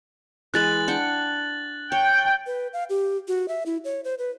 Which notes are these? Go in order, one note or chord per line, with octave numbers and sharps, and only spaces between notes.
E3 G#3 B4 F#6 A6 F#7
D4 F#5 G5
C#5 G5
B4
F5
G4
F#4
E5
E4
C#5
C5
B4